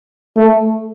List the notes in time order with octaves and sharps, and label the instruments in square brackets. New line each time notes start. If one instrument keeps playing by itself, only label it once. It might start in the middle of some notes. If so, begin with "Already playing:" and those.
[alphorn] A3